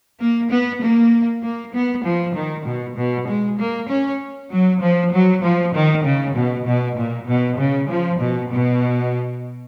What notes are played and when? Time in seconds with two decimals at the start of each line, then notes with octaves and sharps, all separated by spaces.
0.20 A#3
0.50 B3
0.82 A#3
1.43 A#3
1.73 B3
2.04 F3
2.35 D#3
2.65 B2
2.97 B2
3.27 G#3
3.58 A#3
3.89 C#4
4.51 F#3
4.81 F3
5.12 F#3
5.43 F3
5.73 D#3
6.04 C#3
6.35 B2
6.66 B2
6.96 A#2
7.27 B2
7.58 C#3
7.89 F3
8.19 B2
8.51 B2